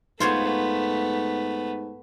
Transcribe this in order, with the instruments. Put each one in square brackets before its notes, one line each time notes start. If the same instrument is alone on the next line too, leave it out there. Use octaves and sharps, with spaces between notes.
[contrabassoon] G#2 [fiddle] A3 B3 [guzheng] F4 C5 C#5